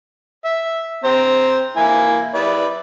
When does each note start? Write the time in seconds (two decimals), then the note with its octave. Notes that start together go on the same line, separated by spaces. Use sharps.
0.45 E5
1.04 C4 C5 A#5
1.77 A#3 E4 G#5
2.34 E4 B4 D5